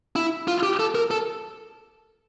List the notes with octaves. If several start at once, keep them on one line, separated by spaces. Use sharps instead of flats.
E4
F4
G4
A4
A#4
A4